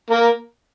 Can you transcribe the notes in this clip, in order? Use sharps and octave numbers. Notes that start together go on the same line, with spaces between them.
A#3